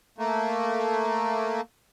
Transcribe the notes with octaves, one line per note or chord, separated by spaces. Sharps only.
A3 A#3